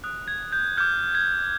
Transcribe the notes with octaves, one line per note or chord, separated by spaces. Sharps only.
D#6 F#6
G#6
G6
D6 F6 G6
G#6